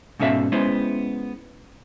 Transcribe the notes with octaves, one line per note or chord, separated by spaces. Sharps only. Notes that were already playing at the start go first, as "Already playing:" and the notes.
G#2 B2 C#4 A4 E5 F5
G#3 B3 C#4 E4 C5